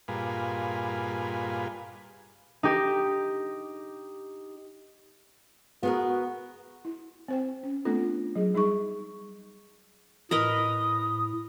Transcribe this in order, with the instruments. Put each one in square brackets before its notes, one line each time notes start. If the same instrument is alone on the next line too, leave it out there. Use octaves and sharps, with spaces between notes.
[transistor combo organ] G2 A#2 F4 G#4 B4
[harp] D#4 G4
[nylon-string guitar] B3 G#4 A#4 [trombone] F#4
[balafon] E4
C4 C5 G5
C#4
A3 B3 C4 D4 F4 A4
F#3 G#4
G3 D#4 G#4 C#6
[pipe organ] A2 [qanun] A#4 B4 D#5 [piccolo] D#6